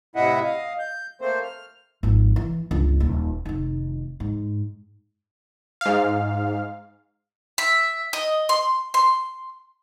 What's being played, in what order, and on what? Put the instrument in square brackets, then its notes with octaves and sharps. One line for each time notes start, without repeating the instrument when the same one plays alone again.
[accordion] A2 C3 E4 D#5 E5 F#5
D#5 F5
G6
A3 A#3 C4 C5
F6
[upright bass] G#1 F3
E3
G1 C#2
D#1
F1 D#3
G#2
[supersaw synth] G#2 F5
[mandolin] E5
D#5
C6
C6